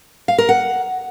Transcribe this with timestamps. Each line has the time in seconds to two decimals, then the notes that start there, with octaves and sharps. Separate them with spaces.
0.28 F5
0.38 A#4
0.49 F#5